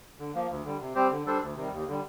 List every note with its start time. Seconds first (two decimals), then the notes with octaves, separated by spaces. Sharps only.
0.19 D3
0.35 F3 A#3
0.50 D2
0.64 D3 G3
0.81 C3
0.95 G3 C4 G4 C5
1.11 D3
1.26 G3 D4 A4 C5
1.42 D2
1.56 C3 D#3 G3
1.72 D#2
1.87 D3 G3